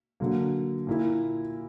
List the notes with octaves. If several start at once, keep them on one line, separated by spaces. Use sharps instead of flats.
D3 F#3 A#3
A#2 A#3 E4